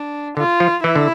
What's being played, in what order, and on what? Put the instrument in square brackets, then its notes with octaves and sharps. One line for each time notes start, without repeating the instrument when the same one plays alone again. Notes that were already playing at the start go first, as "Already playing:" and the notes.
Already playing: [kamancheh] D4
[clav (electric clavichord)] D3 [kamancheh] F4
[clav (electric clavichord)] F3
[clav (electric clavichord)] E3 [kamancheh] E4
[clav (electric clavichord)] D3